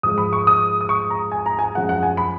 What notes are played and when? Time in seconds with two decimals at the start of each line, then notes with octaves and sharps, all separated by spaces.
0.03 G#2 F3 G#3 D#6
0.18 B5
0.33 C#6
0.47 D#6
0.81 D#6
0.89 C#6
1.10 A#5
1.32 G#5
1.46 A#5
1.59 G#5
1.75 F#2 F3 G#3 F#5
1.89 F#5
2.03 G#5
2.17 B5